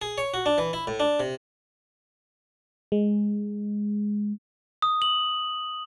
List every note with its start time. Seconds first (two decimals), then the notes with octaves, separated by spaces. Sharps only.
0.02 G#4
0.18 C#5
0.34 F#4
0.46 D4
0.58 E3
0.73 E4
0.87 A2
1.00 D4
1.20 C3
2.92 G#3
4.82 D#6
5.02 F#7